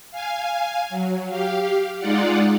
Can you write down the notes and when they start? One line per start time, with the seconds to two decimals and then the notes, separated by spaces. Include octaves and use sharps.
0.11 F5 G#5
0.90 F#3
1.30 G4 F5
1.99 G#3 D#4 F4 D5 F#5